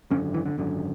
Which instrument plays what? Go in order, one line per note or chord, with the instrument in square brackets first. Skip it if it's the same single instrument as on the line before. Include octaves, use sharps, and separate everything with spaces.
[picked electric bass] G#1 F#2 D3 C#4
E3
D3
G#1 F#2 D3